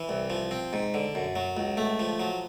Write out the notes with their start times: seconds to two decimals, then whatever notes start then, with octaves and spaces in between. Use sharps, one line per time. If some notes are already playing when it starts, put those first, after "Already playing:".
Already playing: E3
0.09 C2
0.30 F3
0.51 C4
0.73 G#2
0.94 D3
1.15 F#2
1.36 F#3
1.57 C#2
1.77 A3
1.99 F3
2.20 F#3